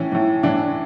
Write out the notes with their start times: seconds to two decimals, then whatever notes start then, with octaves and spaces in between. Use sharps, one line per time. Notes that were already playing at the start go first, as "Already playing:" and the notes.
Already playing: A2 E3 C#4
0.12 A2 E3
0.43 A2 E3 D4